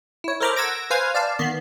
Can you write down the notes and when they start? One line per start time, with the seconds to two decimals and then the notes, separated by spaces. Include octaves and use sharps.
0.24 E4 C#5
0.40 A4 A#4 C5 A#5 B5 D6
0.56 F#5 E6 G#6 A#6 D7
0.90 B4 C5 F5 G#5 F6 G#6
1.15 D5 F5 A5
1.39 D#3 B3 C7